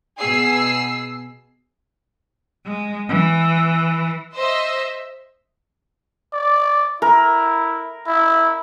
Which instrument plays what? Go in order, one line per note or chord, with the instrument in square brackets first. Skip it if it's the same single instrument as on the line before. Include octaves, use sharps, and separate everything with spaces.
[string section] B2 G#4 E6 C7
[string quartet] G#3
E3
[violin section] C5 D#5 E5 E6
[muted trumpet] D5
[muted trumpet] E4 [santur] A#4
[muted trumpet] E4